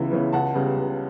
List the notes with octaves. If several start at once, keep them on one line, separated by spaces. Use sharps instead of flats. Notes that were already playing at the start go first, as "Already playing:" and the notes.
Already playing: C#2 C#3 E3 B3 E5
C#3 E3 B3
C#2 F#5 A5
C#3 G3 B3
C#2